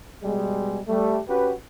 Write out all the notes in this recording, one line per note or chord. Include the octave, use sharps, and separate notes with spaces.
B2 G3 G#3
G3 A3
C#4 F#4 G4 B4